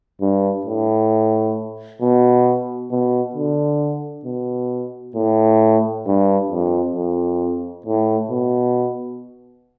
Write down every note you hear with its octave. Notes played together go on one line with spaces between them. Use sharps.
G2
A2
B2
B2
D3
B2
A2
G2
F2
F2
A2
B2